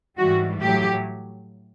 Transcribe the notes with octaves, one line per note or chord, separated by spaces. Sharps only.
G#2 E3 G3 F#4
A2 F#3 G4